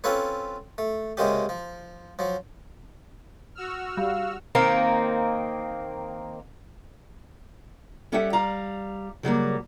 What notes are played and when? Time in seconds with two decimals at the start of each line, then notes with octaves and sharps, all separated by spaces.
0.04 C4 C#4 F4 A4 B4 C#5
0.78 A3
1.17 C#2 C3 G#3 A#3 C#4 G4
1.49 F3
2.19 F3 F#3
3.55 F#4 E6 F6
3.97 G3 F5
4.55 D#3 A#3 C4
8.12 G3 C#4 G4 A4 E5 F#5
8.33 G3 F5 A#5
9.23 C#3 F#3 G3 A#3